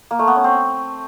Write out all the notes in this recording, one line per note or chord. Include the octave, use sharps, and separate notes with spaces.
A#3
A3
B3
C#4
C4